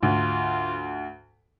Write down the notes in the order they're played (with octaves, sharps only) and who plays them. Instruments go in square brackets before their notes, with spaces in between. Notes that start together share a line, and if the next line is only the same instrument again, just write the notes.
[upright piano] D2 [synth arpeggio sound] G#2 [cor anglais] F4